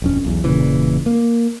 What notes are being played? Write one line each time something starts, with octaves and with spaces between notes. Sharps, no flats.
D#1 F2 C#4
B1 E2
E1 A#2 C#3 E3
A#3